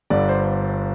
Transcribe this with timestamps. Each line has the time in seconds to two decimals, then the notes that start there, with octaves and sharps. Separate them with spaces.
0.10 G1 G2 D3 D5
0.29 C5